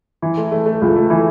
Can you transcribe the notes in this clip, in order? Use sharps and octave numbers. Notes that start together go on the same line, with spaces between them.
E3
A3
A3
A3
C#2
A3
E3